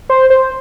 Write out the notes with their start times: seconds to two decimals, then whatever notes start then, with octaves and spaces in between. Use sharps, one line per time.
0.09 C5
0.30 C5